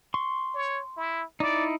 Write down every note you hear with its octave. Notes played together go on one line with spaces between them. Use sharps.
C6 C#6
C#5
E4
D#4 E4 D5